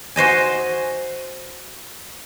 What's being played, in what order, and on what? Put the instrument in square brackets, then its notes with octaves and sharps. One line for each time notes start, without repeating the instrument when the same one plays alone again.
[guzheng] F#4 C5 D#5 G#5